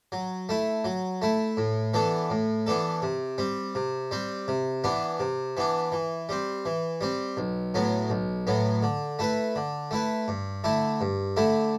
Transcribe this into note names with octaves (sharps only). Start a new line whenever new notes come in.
F#3
A3 E4
F#3
A3 E4
A2
E3 B3 D4 A4
A2
E3 B3 D4 A4
C3
G3 C4
C3
G3 C4
C3
E3 B3 D4
C3
E3 B3 D4
E3
G3 C4
E3
G3 C4
B1
A2 F#3 B3
B1
A2 F#3 B3
D3
A3 E4 B4
D3
A3 E4 B4
G2
D3 A3 E4
G2
D3 A3 E4